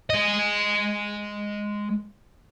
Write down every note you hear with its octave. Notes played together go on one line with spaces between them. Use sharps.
G#3 D#5